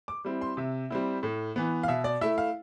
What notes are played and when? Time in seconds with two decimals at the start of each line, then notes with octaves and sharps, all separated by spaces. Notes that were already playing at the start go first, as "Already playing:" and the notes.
0.08 D6
0.25 G3 C4 E4
0.41 C6
0.57 C3 E5
0.90 G3 C4 E4
1.23 A2
1.56 E3 B3
1.83 F5
1.88 B2 E5
2.04 D5
2.21 A3 E4 E5
2.38 F5